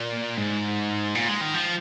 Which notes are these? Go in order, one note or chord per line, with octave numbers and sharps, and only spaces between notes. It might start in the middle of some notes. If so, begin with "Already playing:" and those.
Already playing: A#2
G#2
A#2
G#3
D#3
F3